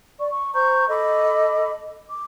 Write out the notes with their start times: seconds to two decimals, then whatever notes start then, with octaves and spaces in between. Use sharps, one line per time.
0.19 D5 C#6
0.31 C#6
0.54 C5 A#5 C#6 G6
0.89 A4 D#5 B5 D6
2.09 D6